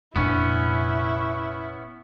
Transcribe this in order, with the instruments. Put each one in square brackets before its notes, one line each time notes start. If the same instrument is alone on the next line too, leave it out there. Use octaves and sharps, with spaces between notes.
[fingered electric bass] F1 A#2 D4 [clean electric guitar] B3 C#4 [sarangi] E4